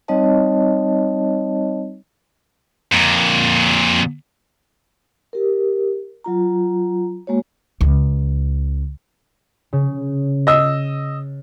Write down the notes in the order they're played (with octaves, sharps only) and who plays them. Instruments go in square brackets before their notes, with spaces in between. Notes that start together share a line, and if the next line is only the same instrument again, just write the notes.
[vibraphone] G3 C4 D#4 C#5 D#5 A5
[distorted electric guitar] F2 A#2
[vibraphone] G4 A#4
F#3 F4 A#5
G#3 A#3 F#4 C#5
[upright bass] C#2
[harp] C#3
[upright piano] D#5 E6